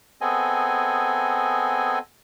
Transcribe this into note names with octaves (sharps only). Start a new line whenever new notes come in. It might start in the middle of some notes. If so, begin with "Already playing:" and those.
B3 C4 G#4 A4 D#5 G#5